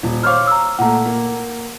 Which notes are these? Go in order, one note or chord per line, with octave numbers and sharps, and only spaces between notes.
D#1
C5 C#5 F5 D6 F6
A#5 E6
A#2 A3 F#5 A#5
A#3